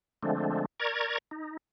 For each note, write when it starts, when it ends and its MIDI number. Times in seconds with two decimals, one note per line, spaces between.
0.23 0.65 50
0.23 0.65 53
0.23 0.65 56
0.23 0.65 57
0.23 0.65 60
0.23 0.65 62
0.80 1.18 70
0.80 1.18 74
0.80 1.18 82
0.80 1.18 85
0.80 1.18 92
1.31 1.57 63